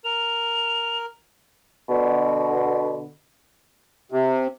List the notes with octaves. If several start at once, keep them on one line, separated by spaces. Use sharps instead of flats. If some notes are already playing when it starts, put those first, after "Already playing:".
A#4 F7
B2 D3
C3